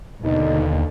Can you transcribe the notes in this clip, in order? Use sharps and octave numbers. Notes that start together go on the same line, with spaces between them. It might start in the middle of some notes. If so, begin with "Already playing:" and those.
D#2 B2 D3 D#4